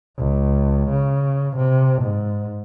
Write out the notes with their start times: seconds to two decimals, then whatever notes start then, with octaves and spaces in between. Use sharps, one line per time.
0.17 C#2
0.90 C#3
1.57 C3
2.03 G#2